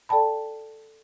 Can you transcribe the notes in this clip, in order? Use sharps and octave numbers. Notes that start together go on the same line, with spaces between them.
A4 D5 G5 A5 B5